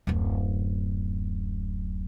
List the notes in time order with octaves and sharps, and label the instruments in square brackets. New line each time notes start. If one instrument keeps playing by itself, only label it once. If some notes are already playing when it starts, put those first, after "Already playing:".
[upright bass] D1 F#2